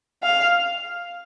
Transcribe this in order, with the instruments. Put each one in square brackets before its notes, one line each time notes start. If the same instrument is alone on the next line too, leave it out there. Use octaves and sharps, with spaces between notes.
[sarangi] F5